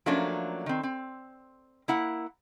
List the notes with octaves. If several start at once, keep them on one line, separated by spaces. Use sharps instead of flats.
F3 F#3 A3 A#3 C#4 D4
D#3 C4
C4
A#3 E4 F#5